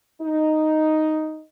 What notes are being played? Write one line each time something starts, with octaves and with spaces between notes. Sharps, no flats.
D#4